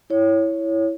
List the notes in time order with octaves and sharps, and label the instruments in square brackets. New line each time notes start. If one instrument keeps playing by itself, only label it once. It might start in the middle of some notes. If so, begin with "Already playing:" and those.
[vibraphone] E4 C#5